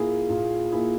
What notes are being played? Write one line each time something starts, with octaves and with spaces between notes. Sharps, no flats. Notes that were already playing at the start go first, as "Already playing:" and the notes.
Already playing: A#2 A#3 E4 G#4
A#2
A#3 E4 G#4